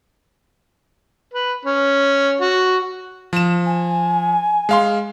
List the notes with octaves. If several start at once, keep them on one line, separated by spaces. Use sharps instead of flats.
B4
C#4
F#4
F3 E7
G#5
G#3 F5 C6